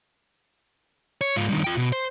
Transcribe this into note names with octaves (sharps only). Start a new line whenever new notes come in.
C#5
G#2 F4
G2 D#3
F4 G5
B2
C5